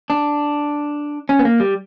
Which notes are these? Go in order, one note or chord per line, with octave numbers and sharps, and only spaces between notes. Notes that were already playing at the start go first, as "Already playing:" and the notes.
D4
C#4
B3
A#3
G3